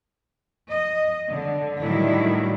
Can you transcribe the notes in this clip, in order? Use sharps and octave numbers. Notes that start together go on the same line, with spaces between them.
D#5
D3
A2 D#3 F#3 G3 D4 E4